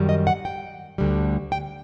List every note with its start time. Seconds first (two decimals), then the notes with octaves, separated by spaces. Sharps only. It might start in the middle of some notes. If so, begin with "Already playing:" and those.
Already playing: F#2 D#3 G3
0.09 D#5
0.27 F#5
0.45 G5
0.98 D2 D3 G3
1.52 G5